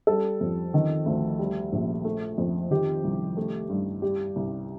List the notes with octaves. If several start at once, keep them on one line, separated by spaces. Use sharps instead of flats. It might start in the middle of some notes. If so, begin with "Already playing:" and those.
G3 A4
F2
D#3
D2
G3
A#1
A3
F2
D#3 G4
C2
A3
G2
G3 G4
C2